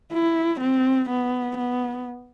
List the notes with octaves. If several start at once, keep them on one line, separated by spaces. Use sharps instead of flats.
E4
C4
B3
B3